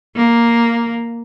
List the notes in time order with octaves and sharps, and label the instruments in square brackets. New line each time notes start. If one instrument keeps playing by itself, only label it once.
[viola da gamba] A#3